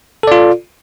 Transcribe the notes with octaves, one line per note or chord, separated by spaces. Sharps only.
F4 A4 D5